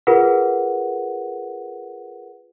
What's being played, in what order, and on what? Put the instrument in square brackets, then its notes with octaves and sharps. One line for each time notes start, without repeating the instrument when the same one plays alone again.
[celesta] F4 G#4 A#4 B4 F#5